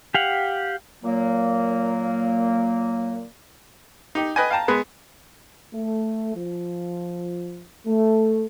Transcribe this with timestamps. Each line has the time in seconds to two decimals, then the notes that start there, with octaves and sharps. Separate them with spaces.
0.14 G4 F5 F#5
1.03 A#2 F#3 A#3
4.15 D#4 G4
4.36 B4 D#5 G5 G#5
4.50 F5 G5 A5 A#5
4.68 G#3 B3 G#4 B4
5.72 A3
6.35 F3
7.86 A3